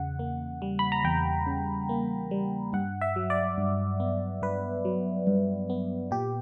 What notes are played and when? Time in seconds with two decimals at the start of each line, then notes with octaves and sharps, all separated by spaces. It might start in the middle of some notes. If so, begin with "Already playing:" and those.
Already playing: E2 C#3 F#5
0.19 A#3
0.62 G3
0.79 B5
0.92 A#5
1.04 E2 G5
1.46 C#3
1.89 A#3
2.31 G3
2.73 G2 F#5
3.01 E5
3.16 F#3
3.30 D5
3.58 G2
4.00 B3
4.42 G2 B4
4.85 F#3
5.27 G2
5.70 B3
6.11 A#2 G4